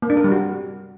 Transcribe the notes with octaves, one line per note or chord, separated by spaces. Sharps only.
A#3
D4
A#4
G3
F#4